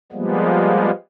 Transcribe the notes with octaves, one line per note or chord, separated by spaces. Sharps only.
F3 G3 G#3 A#3 B3